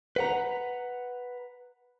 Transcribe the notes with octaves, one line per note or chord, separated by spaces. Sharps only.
B4 F#5 A#5